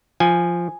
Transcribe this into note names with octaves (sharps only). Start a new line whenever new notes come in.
F3 G#5